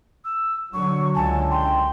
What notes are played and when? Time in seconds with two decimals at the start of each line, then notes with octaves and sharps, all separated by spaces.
0.25 E6
0.74 D3 F#3 C#6
1.15 C#2 D3 G#5 A5
1.51 G5 C6